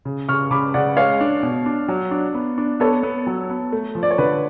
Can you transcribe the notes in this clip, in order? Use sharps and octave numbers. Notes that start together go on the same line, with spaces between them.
C#3
C#3 C#6 F6
C#3 B5 D6
C#3 D5 F#5
G#3 C#5 F5
D4
B2
D4
F#3
D4
B3
D4
B3 A4 C#5
B3
F#3
B3
A3
F3
D5
C#5
D3 B4